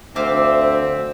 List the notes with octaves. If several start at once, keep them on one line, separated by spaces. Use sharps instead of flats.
D2 C4 E5 F5 D6